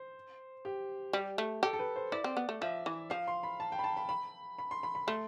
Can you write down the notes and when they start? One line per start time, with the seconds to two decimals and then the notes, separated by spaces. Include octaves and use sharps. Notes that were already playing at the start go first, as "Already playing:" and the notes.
Already playing: C5
0.65 G4
1.13 G3
1.38 A3
1.63 G4 A4
1.73 A4
1.79 B4
1.96 C5
2.12 E4 D5
2.24 C4
2.37 B3
2.49 A3
2.61 F3 E5
2.86 E3
3.10 F3 F5
3.28 C6
3.43 B5
3.60 A5
3.72 G5
3.79 B5
3.84 A5
3.97 B5
4.09 B5
4.59 B5
4.71 C6
4.83 B5
4.95 B5
5.07 A3 C6